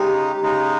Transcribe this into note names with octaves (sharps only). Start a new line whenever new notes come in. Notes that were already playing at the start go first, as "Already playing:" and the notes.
Already playing: C#3 G#3 D#4 G4
C#3 G#3 D#4